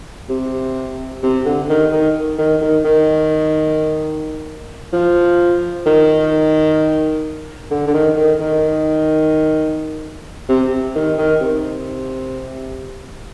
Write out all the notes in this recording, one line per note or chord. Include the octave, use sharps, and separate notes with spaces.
C3
C3
D3
D#3
D#3
D#3
D#3
D#3
F3
D#3
D3
D3
D#3
D#3
D#3
C3
D#3
D#3
C3